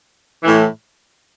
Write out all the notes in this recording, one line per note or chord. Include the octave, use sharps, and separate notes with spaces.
A2 E3